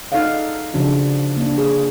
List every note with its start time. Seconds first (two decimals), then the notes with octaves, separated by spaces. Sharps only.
0.12 D#4 A4 D5 F5 F#5
0.74 C#3 F3 D4 F#4
1.37 A#3 D4
1.58 G#4